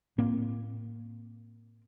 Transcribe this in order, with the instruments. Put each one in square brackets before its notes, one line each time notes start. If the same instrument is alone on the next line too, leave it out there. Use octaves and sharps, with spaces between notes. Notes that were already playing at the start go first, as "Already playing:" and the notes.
[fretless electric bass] A2 A#3 C4